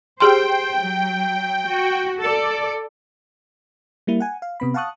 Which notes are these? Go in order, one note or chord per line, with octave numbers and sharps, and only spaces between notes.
G4 G#4 C5 G5 C6
F#3
F#4
A4 D5
G3 A#3 E4
F#5 G#5
F5
C3 B3 B5
F5 F#5 A5 C#6 D#6 F#6